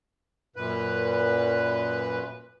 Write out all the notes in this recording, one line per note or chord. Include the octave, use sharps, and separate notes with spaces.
F#2 A#2 B4